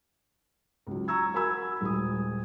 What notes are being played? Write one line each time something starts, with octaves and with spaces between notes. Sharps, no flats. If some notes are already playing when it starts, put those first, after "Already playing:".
C#2 F#3
A#5 C#6 E6 G#6
F#4 A#4 G#5 B5 E6 G#6
D#1 G#3 D#6